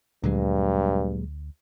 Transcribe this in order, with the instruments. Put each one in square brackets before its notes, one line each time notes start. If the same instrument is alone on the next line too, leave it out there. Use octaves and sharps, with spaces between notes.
[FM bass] D2 [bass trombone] G2 [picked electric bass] A#2 F#3 G#3